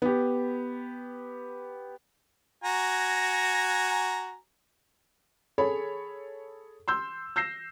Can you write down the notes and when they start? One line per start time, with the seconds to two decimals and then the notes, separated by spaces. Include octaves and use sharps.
0.02 B3 G4
2.64 F#4 G#5 A#5
5.58 G#4 A4 C#5 B5
6.88 C6 E6 G6
7.36 E6 G6 A#6 C7 E7